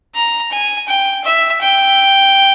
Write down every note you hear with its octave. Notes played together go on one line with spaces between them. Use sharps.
A#5
G#5
G5
E5
G5